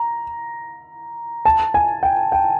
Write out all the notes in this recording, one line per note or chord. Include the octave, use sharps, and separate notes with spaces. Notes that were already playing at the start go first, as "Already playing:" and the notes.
Already playing: A#5
A5
G#5
G5
G5